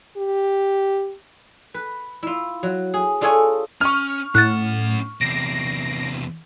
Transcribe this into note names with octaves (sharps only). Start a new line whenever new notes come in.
G4
B4
E4 F4
F#3
G#4
D4 F4 G#4 A4 C#5 G#5
C#4 C#6 F6
A2 C#4 F#5 F#6 A6
E2 C3 A#6 C7 D7